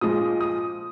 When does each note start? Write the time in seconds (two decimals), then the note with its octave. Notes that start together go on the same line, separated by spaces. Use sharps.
0.01 A#2 F3 G#3 D#6
0.41 D#6